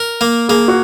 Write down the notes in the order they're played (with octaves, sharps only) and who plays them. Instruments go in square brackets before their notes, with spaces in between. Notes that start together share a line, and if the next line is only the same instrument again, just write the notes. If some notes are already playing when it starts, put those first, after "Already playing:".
Already playing: [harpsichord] A#4
A#3
[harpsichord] A#3 [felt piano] G#4
[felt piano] F#4